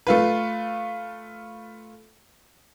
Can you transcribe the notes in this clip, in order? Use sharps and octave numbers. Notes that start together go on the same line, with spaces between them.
A3 F4 B4